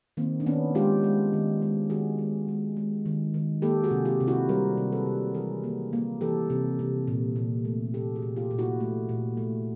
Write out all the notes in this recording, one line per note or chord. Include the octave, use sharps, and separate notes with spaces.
D#3 A#3 C4
D4
D#3 B3 C#4
G#3 F4 G4
G#3
D#3
G#3
D#3 F#4 G#4
G#3
G#3
G#3
D#3
D#3
A#3 G4 A4
F#4 G#4
C3
F4 G4
C3
E4 F#4
G3 A#4 C5
C3
A4 B4
C3
E3 G#4 A#4
A#3
A#3
E3 G4 A4
C3
C3
A#2
A#2
A3
A#2 G4 A4
F#4 G#4
A#2
F4 G4
A#2
E4 F#4
A3
A#2
A3